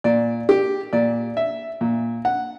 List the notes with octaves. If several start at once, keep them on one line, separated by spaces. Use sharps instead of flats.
A#2 D5
G4
A#2 D5
E5
A#2
F#5